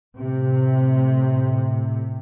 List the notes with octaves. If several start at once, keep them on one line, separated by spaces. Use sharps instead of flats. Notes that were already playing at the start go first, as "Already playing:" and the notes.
A2 C3